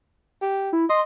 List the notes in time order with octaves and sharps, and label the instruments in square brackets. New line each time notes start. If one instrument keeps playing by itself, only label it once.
[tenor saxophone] G4
[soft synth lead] E4
[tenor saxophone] D#5 [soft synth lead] C6